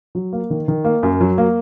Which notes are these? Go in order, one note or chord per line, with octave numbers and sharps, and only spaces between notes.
F#3
A#3
D#3
D#3
A#3
F#2
F#3
A#3